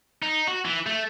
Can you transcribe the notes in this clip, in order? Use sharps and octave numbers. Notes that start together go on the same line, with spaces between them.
D#4
F#4
E3
A3